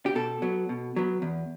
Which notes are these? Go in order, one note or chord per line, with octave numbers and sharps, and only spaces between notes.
G4
B2 A4
F#3 B3
B2
F#3 B3
E2